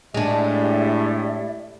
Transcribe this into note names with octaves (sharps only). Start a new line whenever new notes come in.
A2 G#3 D4 G4 D5 E5